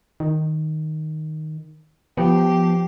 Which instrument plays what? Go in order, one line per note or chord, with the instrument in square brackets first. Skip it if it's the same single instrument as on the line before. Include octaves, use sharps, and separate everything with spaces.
[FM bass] D#3
[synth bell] F3 [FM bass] B3 [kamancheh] G4